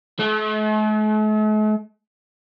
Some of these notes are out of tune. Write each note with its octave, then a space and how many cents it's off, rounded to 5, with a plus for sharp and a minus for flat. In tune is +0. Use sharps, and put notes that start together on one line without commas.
A3 -45